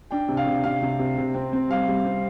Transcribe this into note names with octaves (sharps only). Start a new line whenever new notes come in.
D4 G5
C3
F5
C3
C3 F5
C3
C3
C3
C4
C4
G3 F5
G3
C4